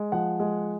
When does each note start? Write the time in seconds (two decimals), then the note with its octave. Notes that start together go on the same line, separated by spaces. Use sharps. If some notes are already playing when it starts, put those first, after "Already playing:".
Already playing: G#3
0.12 F3 F#5
0.40 G#3